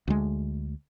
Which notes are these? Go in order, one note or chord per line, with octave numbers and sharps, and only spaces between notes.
D2 G#3